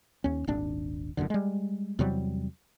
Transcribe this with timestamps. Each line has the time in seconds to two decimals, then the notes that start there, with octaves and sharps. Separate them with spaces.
0.24 D#2 C#4
0.47 D#1 G#1 D4
1.17 F1 A#1 F#2 D3
1.30 G3 G#3
1.99 E2 C3 F#3 G3